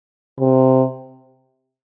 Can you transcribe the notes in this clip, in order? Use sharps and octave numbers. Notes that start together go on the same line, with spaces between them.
C3